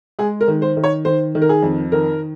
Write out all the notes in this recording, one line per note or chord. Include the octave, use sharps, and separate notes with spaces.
G#3 G#4
A#4
D#3
C5
D#3
C#5
D#3 C5
D#3
A#4
G#4
F2
D#3 A#4